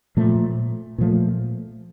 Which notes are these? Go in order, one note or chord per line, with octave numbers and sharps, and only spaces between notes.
A#2 F3 A3
A#2 F3 A3